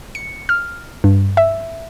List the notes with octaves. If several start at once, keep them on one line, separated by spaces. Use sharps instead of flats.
C#7
F6
G2
E5